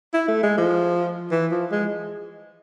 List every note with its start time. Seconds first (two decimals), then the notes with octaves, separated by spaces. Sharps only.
0.13 E4
0.28 A3
0.43 G#3
0.58 F3
1.32 E3
1.52 F3
1.71 G#3